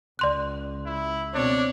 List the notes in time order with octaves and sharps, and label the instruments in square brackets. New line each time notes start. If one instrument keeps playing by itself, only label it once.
[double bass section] C#2 [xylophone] D5 C6 F#6
[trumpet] E4
[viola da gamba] B2 C4 C#5 [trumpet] D4